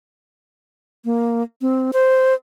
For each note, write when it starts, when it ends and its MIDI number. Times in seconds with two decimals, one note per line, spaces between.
1.05 1.42 58
1.61 1.91 60
1.93 2.34 72